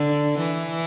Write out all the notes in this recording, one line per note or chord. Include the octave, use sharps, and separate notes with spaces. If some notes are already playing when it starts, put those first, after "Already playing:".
Already playing: D3
E3